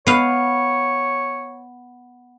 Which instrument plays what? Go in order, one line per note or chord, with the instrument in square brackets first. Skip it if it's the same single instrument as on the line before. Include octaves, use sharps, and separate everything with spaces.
[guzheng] B3 F5 [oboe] C#5